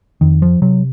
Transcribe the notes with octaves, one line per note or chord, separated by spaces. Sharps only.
F2 D#3
F3
C3 F#3